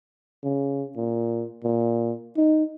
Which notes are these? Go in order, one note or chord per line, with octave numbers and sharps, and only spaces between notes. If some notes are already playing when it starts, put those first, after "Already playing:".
C#3
A#2
A#2
D#4